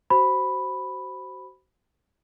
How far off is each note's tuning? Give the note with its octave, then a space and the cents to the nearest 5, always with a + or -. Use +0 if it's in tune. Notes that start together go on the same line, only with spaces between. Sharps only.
F#4 +30 C5 +0 B5 +0